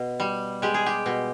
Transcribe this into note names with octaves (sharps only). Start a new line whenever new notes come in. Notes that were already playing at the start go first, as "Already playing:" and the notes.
Already playing: B2
G3
G#3 G4
G#4
G4
B2